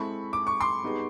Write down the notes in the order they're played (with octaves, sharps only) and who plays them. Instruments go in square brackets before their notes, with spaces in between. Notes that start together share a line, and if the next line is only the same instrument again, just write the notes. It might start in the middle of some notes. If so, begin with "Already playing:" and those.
Already playing: [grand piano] G#3 C4 E4 A4 [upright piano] B5 C#6
[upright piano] D6
C#6
C6 D6
[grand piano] G3 B3 D#4 G#4